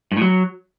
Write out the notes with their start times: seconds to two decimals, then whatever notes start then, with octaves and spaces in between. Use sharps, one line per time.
0.12 G2
0.17 A2
0.22 F#3